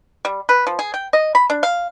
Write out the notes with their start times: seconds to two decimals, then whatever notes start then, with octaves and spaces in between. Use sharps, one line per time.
0.25 G3
0.49 B4
0.67 F3
0.79 G#4
0.94 G5
1.13 D#5
1.35 B5
1.50 D4
1.63 F5